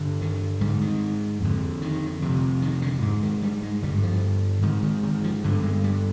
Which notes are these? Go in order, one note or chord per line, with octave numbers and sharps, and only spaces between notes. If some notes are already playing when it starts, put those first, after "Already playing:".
Already playing: G2 D3
D#3
G#2 G3
D#3
F2 D3
D#3
F2 C3
D#3
D3
G#2
D#3
G3
G#3
G2 D3 G3
F3
G#2 D#3
D#3
D#3
F3
G2 D3
G#3
G3